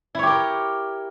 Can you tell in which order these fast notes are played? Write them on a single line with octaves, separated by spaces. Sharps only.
E4 C#5 G4 A#4